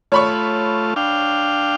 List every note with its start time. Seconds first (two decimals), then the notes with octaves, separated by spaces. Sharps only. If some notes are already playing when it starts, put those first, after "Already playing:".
0.12 A3 F4 C#5 B5 C#6
0.96 D4 F5 G5